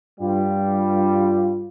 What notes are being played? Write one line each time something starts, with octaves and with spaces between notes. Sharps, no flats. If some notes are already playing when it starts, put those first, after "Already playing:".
G2 G3 F4